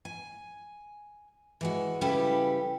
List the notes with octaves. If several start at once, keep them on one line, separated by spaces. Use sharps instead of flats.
G#5
E3 G#3 F#4
C#3 G3 E4 G4 A4 B4